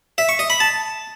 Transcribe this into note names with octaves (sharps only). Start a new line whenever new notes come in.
E5
C#6
D#5
B5
A5